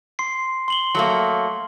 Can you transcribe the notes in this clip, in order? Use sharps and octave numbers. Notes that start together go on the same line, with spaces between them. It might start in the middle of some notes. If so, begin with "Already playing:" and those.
C6 C7
C6 F#7 G7
F#3 A3 A#3